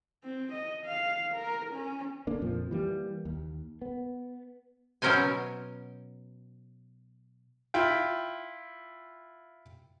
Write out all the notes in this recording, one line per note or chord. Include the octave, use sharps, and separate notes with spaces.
C4
D#5
F5
A#4
C#4
D3 A#3 D4
F2 A#2 F3
E3 G3 A#3
D#2
B3
B2 F#3 C#4 A#4 C5 G#5
E4 F4 G5